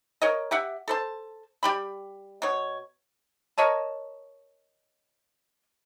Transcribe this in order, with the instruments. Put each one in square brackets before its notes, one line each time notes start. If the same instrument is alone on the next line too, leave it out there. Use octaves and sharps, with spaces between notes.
[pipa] A#4 C#5 D#5
G4 E5 F#5
A4 C5 A5
G3 G4 B5
B2 C#5
A#4 C#5 D#5 A5